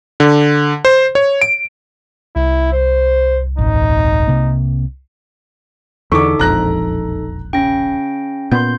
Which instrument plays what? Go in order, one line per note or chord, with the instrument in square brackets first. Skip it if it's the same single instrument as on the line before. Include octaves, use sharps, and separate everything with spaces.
[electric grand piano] D3
C5
C#5
D7
[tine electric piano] C2 [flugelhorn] E4
[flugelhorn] C5
[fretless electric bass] D#1 G#1 [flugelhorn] D#4
[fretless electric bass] C3 A#3
[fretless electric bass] E2 D3 [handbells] D#4 A4 [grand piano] C#6 D6
[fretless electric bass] E1 A#1 F2 [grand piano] A#5 F#6 A#6
[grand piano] C#3 [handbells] G5 A#6
[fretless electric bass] A#2 B3 [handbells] C6 G6